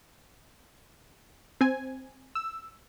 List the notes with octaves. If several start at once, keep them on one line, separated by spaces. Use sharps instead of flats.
C4 G#5
E6